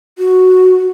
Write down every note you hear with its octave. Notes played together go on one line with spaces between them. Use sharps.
F#4